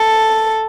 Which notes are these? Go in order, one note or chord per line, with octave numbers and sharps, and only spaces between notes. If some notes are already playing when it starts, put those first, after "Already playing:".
Already playing: A4